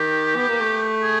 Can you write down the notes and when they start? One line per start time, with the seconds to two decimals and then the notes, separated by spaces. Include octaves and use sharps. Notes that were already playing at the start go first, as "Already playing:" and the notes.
Already playing: D#3 G4
0.36 B3
0.48 A#3
0.61 A3
1.03 G#4